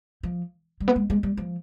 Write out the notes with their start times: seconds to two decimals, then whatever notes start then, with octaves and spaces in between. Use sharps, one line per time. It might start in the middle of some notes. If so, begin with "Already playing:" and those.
0.23 F3
0.80 G3
0.88 B3
0.96 G#3
1.10 G#3
1.23 G3
1.37 F3